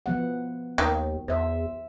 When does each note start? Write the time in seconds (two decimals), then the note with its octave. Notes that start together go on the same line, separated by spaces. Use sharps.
0.06 F3 B3 F#5
0.78 D#2 D#3
1.28 E2 C5 E5